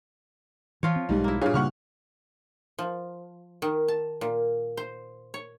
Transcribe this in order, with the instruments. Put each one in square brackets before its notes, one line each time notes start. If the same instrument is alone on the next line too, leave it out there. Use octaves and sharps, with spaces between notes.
[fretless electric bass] E3 [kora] F3 F4 C#5
[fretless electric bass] C4
[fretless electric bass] B1 G#3 [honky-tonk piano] G#2 G3 D#4
[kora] A#3 E4
[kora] G2 A#2 [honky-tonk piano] G#4 C#5 F5
[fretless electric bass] C#3 G3 A#3 [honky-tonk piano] F#5 C#6 F6
[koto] F3
D#3
A5
A#2
C5
C#5